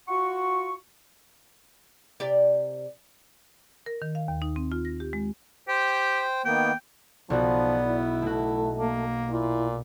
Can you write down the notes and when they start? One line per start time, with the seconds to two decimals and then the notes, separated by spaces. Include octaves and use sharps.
0.08 F4 F#4 F#5 C#6
2.20 C3 G4 D5
3.86 A#4
4.02 D#3
4.15 F5
4.28 D#2
4.42 D#4
4.56 C4
4.72 F4
4.85 A#6
5.00 G4
5.13 G#3
5.68 G4 C5 G5
6.45 D#3 A#3 B3 G5
7.30 B1 F3 B3 F#4 D5
7.85 E4
8.22 B2 A3 F#4
8.77 A#3
9.30 A#2 E4